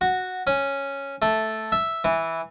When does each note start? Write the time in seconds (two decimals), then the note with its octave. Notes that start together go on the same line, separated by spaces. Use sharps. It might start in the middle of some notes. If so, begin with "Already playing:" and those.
0.01 F#4
0.47 C#4
1.22 A3
1.72 E5
2.04 E3